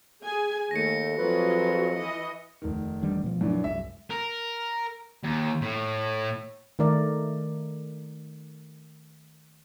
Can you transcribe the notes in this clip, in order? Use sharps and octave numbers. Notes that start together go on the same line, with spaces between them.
G#4 G#5
D#2 A3 A#6 C#7
F2 F#3 F4 G#4 B4
E3 D#5
F1 D#3
E3 G3 D4
B2 F3
F#2 E3 D4
C2 F#2 G#3 E5
A#4
D#2
A2
D#3 A3 A#4 D5